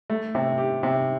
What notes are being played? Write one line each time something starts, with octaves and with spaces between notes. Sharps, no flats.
A3
C3
G4
C3